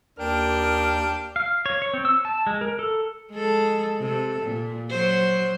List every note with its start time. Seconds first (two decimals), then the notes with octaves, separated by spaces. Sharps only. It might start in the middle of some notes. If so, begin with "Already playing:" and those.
0.19 D#2 D4 A#4 G5 F6
1.36 F5
1.66 C#5
1.82 C#5
1.94 C4
2.05 E6
2.25 A5
2.47 G#3
2.61 A#4
2.79 A4
3.31 G#3 A4
3.99 C3 A4
4.43 A#2
4.90 F#3 F#4 C5